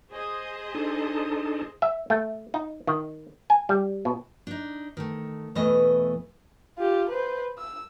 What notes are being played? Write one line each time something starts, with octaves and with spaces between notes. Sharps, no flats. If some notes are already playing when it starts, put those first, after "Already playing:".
G#4 C5 D#5
D4 D#4 A4
E5
A3
D#4
D#3
G#5
G3
B2
D4 D#4
D#3 A3
E2 B2 E3 A3 B4 D#5
F4 G4
B4 C5
E6